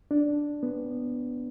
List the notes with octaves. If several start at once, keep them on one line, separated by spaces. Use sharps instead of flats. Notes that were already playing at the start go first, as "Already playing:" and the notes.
D4
B3